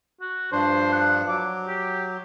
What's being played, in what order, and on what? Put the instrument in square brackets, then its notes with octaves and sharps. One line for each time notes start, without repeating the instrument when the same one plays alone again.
[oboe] F#4
[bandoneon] G2 F3 D4 [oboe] C5
[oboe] F#5
[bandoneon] F#3 [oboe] D6
[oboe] G4